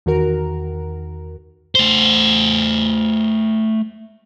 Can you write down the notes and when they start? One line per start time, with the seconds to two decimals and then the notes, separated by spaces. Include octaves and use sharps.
0.06 E2 D#3 F#4 A#4
1.75 A3 C5